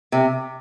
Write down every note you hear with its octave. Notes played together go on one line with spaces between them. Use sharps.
C3